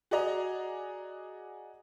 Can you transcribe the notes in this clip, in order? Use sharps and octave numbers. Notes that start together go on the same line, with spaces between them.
F#4 G#4 D5 D#5 A#5